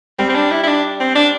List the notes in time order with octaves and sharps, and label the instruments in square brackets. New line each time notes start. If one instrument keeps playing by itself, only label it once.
[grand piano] G3 [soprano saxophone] C4
[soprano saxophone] C4
D4
E4
E4
D4
C4
D4